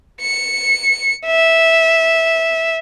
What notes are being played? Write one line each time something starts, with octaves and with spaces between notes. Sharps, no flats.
C#7
E5